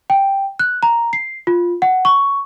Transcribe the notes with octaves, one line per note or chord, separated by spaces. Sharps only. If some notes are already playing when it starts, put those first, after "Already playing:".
G5
F#6
A#5
C7
F4
F#5
C#6